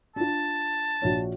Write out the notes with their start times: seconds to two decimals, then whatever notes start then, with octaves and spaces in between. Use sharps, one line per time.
0.16 D4 F4 A5
1.02 A#1 F#4 C#5